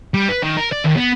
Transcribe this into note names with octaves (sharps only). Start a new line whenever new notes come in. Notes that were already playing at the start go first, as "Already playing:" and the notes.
G3
B4
D#3
A#4
D5
D#2
B3